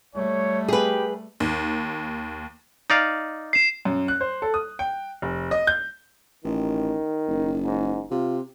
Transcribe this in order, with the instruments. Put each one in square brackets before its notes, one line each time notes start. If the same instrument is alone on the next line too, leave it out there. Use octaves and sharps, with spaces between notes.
[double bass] G3 A3 [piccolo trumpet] C#5
[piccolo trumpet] G4 [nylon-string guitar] G#4 B4
[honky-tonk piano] D#2
[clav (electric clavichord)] D#4 D5 F5
[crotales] C7 E7
[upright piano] F#2
F#6
C5
A4
D#6
G5
F1
D#5
G6
[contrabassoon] A1 [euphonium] D#3
[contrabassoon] F#1
[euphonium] G#2
[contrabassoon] C3 [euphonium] F4